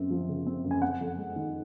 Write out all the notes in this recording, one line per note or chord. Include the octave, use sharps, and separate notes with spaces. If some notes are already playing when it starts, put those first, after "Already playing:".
Already playing: F#2 C4
F3
C#3
C4
F#2
G#5
C4 F#5
F2
G#3
D#3